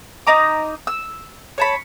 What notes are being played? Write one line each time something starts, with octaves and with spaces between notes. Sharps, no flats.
D#4 D#5 A#5 D6
E6
C#5 A5 B5